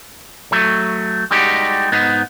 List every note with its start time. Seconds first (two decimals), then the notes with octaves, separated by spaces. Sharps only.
0.52 F#3 A3
1.31 G3 G#3 D#4 F#4 G4
1.92 G#2 B3 D#4